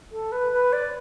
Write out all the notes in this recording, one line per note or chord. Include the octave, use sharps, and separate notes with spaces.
A4
B4
B4
D5